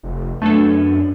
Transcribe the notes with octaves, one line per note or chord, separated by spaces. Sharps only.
F1
F#2 A3 B3 D4 A4 C#5